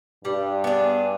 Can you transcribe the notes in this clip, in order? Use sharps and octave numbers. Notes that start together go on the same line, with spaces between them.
G2 G3
B3 D4 G#4